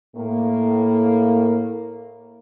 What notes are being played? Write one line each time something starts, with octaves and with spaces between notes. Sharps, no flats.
A2 A#3